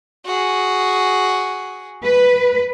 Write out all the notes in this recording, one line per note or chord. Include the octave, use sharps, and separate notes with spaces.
F#4 G#4
B4